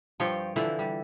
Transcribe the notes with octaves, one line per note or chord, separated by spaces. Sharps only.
G2 F3 C#5 G5
D3 E3 F3 E4
G3